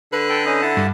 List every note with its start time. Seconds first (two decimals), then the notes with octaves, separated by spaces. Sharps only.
0.13 D3 B4
0.29 A4 G5
0.45 C#4 D#4 D#5
0.62 E4 F#5 A5
0.77 G2